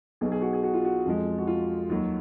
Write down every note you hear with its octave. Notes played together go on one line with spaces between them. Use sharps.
B1 B2 F#3 G#4
G#4
F#4
G#4
F#4
F4
F#4
F2 F3 G#3
F#4
F4
D#2 D#3 F#3